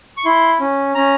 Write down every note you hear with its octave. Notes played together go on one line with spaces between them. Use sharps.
C#6
E4 C6
C#4
C#4 A#5